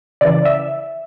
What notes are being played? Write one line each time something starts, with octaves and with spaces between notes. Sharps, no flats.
C#3 E3 D5
E5